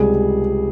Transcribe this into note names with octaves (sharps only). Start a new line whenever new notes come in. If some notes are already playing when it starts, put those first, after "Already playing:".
Already playing: C#2 C3 G3 G#4